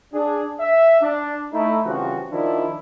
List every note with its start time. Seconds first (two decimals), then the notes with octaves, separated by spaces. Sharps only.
0.13 D4 G#4
0.60 E5
1.01 D4
1.52 A3 D#4 E4
1.85 C#3 E3 F3 G3 C4 F#4
2.32 D#3 F3 D4 E4